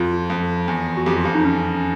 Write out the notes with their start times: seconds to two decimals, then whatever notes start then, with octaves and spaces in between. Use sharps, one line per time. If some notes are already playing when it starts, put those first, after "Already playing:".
Already playing: F2 F4
0.30 F2
0.68 E2
0.97 F#4
1.06 F2 G4
1.16 F4
1.25 F2
1.35 D#4
1.45 C#4